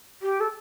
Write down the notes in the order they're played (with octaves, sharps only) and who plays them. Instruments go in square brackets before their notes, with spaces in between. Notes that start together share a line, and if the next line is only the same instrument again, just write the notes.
[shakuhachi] G4
A4